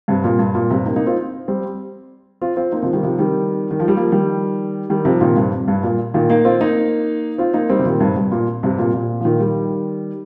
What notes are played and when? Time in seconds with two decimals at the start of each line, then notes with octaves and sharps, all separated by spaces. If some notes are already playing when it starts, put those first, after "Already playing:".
0.08 G2 C3
0.24 A#2
0.39 G2
0.55 A#2
0.70 G2 C3
0.86 A#3 D#4
0.96 A#3 D#4
1.06 C4 F4
1.48 G3 C4
2.42 C4 F4
2.56 C4 F4
2.72 A#3 D#4
2.82 C3 F3
2.93 D#3 G3
3.03 C3 F3
3.19 D#3 G3
3.71 D#3
3.80 F3
3.88 G3
3.96 F3 A#3
4.12 D#3 G3
4.90 D#3 G3
5.05 C3 F3
5.21 A#2 D#3
5.36 G2 C3
5.68 G2
5.83 A#2
6.14 A#2 D#3
6.30 A#3 D#4
6.45 C4 F4
6.60 A#3 D#4
7.38 C4 F4
7.54 A#3 D#4
7.70 G3 C4
7.79 C3
7.85 A#2 D#3
8.00 G2 C3
8.16 G2
8.32 A#2
8.63 G2 C3
8.79 A#2
8.94 A#2
9.20 F3
9.25 A#2 D#3
9.40 D#3 G3